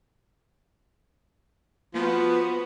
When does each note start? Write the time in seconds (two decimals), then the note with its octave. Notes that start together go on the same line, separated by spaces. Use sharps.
1.94 F3 B3 F#4 B4